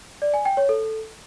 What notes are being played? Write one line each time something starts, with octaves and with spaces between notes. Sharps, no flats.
D5
G#5
G5
C#5
A4